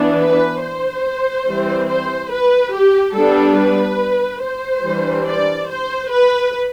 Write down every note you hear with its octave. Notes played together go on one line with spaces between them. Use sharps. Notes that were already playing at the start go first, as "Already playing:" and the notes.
Already playing: E3 B3 D4
B4
C5
E3 G3 C4
C5
B4
G4
G3 B3 D4 A4
B4
C5
E3 G3 D4
D5
C5
B4